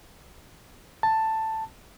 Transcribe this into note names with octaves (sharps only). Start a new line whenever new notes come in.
A5